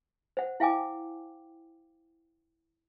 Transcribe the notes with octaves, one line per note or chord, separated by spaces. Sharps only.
C5 F#5
E4 F5 G5 G#5 D6